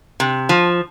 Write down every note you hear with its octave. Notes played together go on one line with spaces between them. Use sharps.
C3
F3